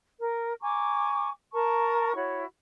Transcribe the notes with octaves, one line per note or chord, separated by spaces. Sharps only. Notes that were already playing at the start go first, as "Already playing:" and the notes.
A#4
G#5 A#5 C#6 D6
A#4 A5 A#5 C#6
E4 F#4 C#5